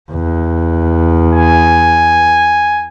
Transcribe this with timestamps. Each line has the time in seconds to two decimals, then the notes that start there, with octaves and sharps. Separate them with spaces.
0.11 E2
1.33 G#5